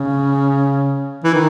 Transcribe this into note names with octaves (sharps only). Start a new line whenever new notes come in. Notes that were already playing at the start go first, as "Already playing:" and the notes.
Already playing: C#3
E3
D#3